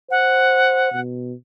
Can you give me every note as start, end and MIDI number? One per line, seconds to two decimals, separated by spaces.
0.11 0.92 72
0.11 1.00 78
0.93 1.34 47